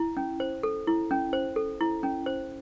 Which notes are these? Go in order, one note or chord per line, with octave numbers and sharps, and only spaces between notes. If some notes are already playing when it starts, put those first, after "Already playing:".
Already playing: E4
C#4
C5
A4
E4
C#4
C5
A4
E4
C#4
C5